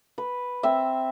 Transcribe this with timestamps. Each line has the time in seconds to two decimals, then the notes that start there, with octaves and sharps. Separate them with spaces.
0.18 B4
0.63 C4 E5